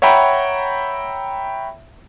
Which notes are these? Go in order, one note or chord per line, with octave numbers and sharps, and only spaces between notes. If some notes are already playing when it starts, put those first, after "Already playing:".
C#5 E5 F#5 G5 A#5 B5